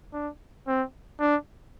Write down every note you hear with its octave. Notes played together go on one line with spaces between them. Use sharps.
D4
C4
D4